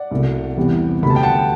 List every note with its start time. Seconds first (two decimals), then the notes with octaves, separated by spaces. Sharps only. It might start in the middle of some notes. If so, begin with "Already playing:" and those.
Already playing: D5 F#5
0.11 C2 B2 A3
0.57 E2 C3 E3 G3 B3
1.02 D2 D3 G3 B3 B5
1.10 A5
1.16 G5
1.23 F#5 A5